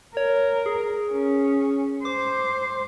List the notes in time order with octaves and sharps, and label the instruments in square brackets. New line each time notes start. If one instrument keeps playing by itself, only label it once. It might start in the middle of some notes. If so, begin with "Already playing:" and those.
[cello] A#4 [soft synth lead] C#5
[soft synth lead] G#4
[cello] C#4
[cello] C5 [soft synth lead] D6